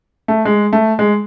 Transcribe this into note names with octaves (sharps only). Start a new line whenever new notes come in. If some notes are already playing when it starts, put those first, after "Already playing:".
A3
G#3
A3
G#3